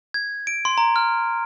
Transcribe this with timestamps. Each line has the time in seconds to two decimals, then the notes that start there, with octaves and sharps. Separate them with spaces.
0.14 G#6
0.47 D7
0.65 C6
0.78 A#5
0.96 F6